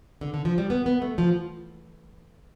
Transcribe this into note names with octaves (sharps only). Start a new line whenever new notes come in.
D3
D3
F3
G3
B3
B3
A3
F3